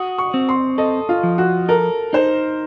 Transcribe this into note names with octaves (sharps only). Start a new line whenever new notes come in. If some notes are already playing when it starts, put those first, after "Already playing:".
Already playing: F#4 D#6
C#6
C4
C6
A4 D#5
F4
F3
F#4
A4 A#4
D#4 C5